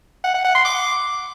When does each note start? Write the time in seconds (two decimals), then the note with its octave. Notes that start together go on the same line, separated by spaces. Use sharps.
0.24 F#5
0.34 F#5
0.45 F#5
0.55 C6
0.65 D6